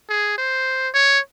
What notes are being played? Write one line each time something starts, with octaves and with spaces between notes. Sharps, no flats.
G#4
C5
C#5